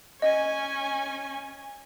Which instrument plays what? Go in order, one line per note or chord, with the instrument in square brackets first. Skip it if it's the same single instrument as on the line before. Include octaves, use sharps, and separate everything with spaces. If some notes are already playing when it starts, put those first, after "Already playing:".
[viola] C#4 G#5 [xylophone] D#5